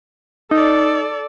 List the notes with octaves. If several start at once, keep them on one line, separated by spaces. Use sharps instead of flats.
D#4 A4 D5